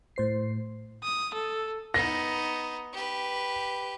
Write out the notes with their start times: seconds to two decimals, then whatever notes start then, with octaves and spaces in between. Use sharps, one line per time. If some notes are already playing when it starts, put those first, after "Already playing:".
0.16 A2 C5 C7
1.03 D#6
1.34 A4
1.94 B3 D#4 A#6
2.93 G4 B4